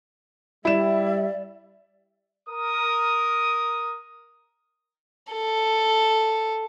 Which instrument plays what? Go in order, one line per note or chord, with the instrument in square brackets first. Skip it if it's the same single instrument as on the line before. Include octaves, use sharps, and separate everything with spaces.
[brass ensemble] G3 [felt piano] E4 E7 [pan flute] D5 [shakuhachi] E5
[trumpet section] A#4 D#6
[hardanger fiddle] A4